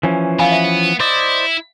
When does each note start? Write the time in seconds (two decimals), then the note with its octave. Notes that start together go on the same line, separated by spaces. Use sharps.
0.03 E3 F3 C#4
0.39 B3 F5 G#5 B5
0.52 E5
1.00 E4 C5 D5 D#5